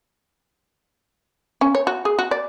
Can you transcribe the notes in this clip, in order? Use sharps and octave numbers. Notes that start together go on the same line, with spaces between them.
C#4
C#5
F#4
G#4
F#4
D5